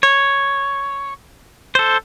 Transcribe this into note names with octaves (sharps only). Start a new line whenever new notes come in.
C#5
A4 C5